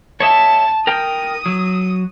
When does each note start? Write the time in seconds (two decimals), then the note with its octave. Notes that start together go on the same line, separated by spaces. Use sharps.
0.20 C#5 D#5 E5 A5
0.87 A#4 G5 D#6
1.46 F#3